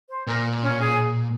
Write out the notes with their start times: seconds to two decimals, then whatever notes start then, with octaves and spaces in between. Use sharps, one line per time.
0.09 C5
0.27 A#2 A#4
0.63 C#4 C#5
0.81 G#4 G#5